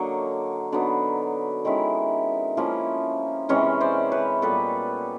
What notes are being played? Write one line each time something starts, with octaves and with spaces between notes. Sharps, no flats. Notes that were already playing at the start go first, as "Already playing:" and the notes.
Already playing: D3 F#3 A#3 C#5 D#5
D3 F#3 B3 D#4
D#3 G#3 C#4 E4
F3 A#3 C#4 E4
C3 E3 G#3 C#4 C#5 D#5
C5 D5
B4 C#5
A#2 G3 B3 A4 B4